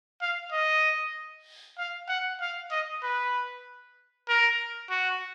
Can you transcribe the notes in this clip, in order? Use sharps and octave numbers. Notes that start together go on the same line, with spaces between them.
F5
D#5
F5
F#5
F5
D#5
B4
A#4
F#4